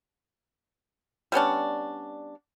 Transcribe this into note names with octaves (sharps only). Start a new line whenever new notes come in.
G3 B3 C#4 D4